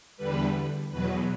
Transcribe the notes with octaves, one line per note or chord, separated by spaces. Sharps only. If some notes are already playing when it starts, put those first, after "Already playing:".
E2 D3 G3 B4
E2 B2 F#3 B4